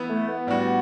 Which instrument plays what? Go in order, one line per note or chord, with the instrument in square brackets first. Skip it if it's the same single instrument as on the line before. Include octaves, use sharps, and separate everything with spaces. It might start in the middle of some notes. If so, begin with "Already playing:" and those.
Already playing: [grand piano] E3 B3 E4
[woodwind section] A3
B3
[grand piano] A2 G3 D4 F#4